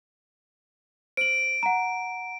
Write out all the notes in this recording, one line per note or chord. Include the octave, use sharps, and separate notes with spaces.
C5 D7 F#7
F#5 A#5